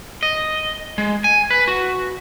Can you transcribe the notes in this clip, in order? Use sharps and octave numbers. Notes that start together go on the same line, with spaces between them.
D#5
G#3
G#5
B4
F#4